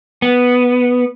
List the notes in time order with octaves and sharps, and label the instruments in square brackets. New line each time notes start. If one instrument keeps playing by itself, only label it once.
[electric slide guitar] B3